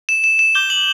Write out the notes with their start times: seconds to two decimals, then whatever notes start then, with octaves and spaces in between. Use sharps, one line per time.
0.09 E7
0.24 E7
0.39 E7
0.55 D6 G6 G7
0.70 F#7